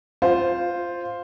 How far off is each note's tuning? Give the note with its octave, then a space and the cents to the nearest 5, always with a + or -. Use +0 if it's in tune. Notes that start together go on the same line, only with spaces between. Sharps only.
F4 +0 C5 +0